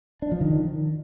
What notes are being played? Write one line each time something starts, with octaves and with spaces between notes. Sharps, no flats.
D4
F3
D#3